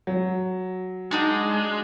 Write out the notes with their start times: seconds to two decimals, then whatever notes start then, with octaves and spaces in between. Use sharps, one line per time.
0.07 F#3
1.11 G#3 D4 D#4 F#4